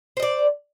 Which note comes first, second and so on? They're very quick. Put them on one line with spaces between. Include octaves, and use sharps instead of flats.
C5 D#5 D5